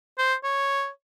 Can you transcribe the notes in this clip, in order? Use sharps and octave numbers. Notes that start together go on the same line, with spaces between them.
C5
C#5